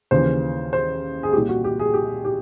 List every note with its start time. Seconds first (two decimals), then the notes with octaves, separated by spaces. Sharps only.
0.11 D#2 C#3 E3 C5
0.73 C5
1.23 G#4
1.33 C2 A#2 G4
1.49 F#4
1.64 G4
1.79 G#4
1.94 G4
2.25 G4